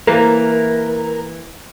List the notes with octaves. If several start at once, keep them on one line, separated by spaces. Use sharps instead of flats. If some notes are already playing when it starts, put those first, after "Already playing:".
E3 A#3 A#4